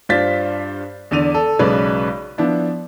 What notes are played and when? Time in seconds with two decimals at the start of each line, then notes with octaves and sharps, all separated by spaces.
0.09 G2 D4 F4 C5 A6 B6
1.11 E2 D3 D5 D#7 F7
1.34 A4
1.59 B1 C#3 G#3 B4 C#5 D5
2.38 F3 B3 D4 E4